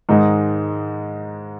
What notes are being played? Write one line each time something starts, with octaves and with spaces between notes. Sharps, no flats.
G#2 D#3 G#3 D#4